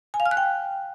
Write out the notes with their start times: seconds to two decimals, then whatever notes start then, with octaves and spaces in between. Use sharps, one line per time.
0.14 G#5
0.20 F5
0.26 F6
0.31 F#6
0.37 G5